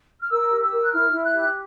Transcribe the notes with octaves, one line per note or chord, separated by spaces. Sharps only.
F6
A#4 E6
G4
E6
A#4
F#6
E4 F6
E4
F#6
G4